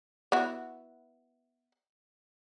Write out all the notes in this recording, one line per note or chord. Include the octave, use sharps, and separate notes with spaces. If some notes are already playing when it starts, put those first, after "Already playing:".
B3 E4 F#4